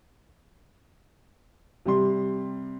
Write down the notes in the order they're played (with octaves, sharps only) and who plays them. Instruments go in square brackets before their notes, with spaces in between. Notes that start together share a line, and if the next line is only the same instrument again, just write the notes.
[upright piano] C3 G3 C6